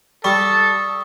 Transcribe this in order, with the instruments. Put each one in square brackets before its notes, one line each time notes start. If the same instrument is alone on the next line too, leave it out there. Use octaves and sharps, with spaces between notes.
[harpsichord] G3 [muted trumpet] A4 [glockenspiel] C#6 D#6